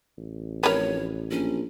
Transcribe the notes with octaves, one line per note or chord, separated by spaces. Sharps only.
A1
F1 A#4 B4 C#5
A#1 C#4